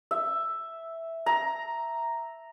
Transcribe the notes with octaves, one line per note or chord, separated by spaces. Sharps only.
E5
A#5